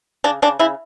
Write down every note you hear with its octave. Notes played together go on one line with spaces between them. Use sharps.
C#3 D4
C#3 D4
C#3 E4